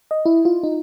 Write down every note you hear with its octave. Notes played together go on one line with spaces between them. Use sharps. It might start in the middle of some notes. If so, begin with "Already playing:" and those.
D#5
E4
F4
D#4